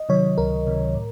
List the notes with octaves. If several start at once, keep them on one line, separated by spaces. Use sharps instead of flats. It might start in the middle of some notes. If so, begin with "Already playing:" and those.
Already playing: D#5
C3 D#3 F#3 C#5
C#2 A#4
C3 D#3 F#3
A2